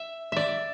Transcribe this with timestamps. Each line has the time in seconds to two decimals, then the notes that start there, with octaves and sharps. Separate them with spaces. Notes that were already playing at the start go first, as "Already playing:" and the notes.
Already playing: E5
0.32 D5 E5